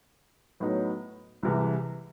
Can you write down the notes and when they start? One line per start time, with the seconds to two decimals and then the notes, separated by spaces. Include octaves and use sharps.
0.60 A2 F#3 B3 D#4
1.43 C2 C3 E3 G#3